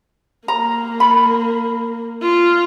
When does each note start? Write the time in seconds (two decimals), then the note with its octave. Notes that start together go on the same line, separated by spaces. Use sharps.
0.48 A#3 A#5
1.00 B5
2.22 F4